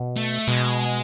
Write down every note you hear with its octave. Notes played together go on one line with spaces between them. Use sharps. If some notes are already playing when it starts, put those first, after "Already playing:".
Already playing: B2
A3
B2 G#3